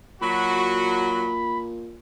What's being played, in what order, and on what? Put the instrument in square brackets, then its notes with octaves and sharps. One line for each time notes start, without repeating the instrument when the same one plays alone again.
[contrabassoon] A#2 [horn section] F#3 F#4 [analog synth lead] B5